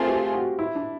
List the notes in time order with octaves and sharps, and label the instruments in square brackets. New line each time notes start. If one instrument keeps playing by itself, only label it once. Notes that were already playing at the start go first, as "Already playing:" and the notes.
Already playing: [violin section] A3 C4 F4 G#4 [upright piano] A#4
[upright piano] G4
F#4
E4
D4